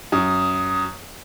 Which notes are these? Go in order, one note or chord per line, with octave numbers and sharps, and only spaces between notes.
F#2 D#6